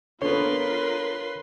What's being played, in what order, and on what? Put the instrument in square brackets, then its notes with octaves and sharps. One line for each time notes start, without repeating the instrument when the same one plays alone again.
[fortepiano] D3 B3 [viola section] F4 A#4 [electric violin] B4 C6 [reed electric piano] C#5